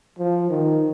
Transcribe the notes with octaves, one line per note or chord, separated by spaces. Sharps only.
F3
D#3